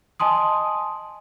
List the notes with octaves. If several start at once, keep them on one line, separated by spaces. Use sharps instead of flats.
D#5 G#5 A5 C6 D#6